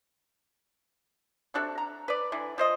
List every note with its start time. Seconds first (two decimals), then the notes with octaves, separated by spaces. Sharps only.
1.54 C3 D4 F#4 A4
1.78 A#5
2.08 B4 D5
2.32 D3 E3
2.58 F3 C5 D#5